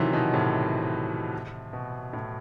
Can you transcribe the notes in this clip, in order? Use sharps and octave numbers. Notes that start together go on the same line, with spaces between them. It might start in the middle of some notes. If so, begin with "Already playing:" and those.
Already playing: C3 D#3 E3 F#3
B2 D#3
A2 C3
B2
A2